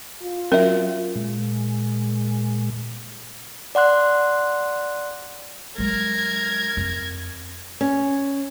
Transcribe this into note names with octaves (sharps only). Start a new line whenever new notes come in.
F4
F#3 C#4 A#4 E5
A#2 G#3
D5 F#5 C6 F#6
F#3 G#3 A#4 G#6
F2
C#4